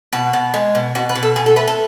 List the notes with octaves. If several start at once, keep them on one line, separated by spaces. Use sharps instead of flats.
B2 F#4
B2
G#3
B2
B2 F#4
B4
B2
A4
B2 G#4
A4
A3 B4
A4